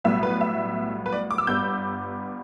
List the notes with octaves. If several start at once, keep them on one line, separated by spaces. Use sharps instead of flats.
B1 A2 G3 B3 E5
B4
E5
B4
D5
D6
E6
G1 G2 G3 B3 G6